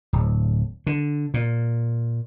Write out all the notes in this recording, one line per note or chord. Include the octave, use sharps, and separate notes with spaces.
D1
D3
A#2